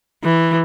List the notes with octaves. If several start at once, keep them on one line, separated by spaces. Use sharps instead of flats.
E3